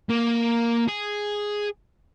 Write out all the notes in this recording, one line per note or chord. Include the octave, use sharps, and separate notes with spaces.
A#3
G#4